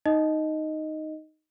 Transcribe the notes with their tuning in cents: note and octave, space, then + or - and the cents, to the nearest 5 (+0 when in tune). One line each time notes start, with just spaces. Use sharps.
D#4 +0 D#5 +0